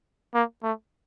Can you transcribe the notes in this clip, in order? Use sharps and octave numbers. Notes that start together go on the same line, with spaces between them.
A#3
A3